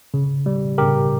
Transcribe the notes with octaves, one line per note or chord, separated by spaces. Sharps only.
C#3
G3
C#3 G4 A#4